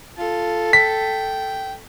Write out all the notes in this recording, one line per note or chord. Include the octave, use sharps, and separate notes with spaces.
F4 A4
G5 B6